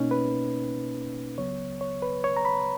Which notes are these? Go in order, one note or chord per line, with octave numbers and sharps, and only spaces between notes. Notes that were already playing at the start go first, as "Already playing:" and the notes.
Already playing: B2 A#3 C#4 D#4
B4
C#2 C#3 F#3 B3 C#5
C#5
B4
C#5
A#5
B5